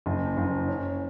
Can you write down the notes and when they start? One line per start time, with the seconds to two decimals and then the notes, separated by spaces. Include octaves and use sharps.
0.06 F#1
0.37 F#1
0.68 C#4